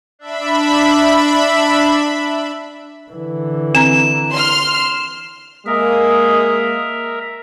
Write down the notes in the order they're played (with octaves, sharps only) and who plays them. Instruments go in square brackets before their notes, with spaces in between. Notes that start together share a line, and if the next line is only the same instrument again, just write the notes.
[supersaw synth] D4 E5 B5
[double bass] D3 E3
[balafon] C4 A#5 [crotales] E7
[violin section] C6 F6
[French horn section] G#3 A#3 [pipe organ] A#4 E5 [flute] D#6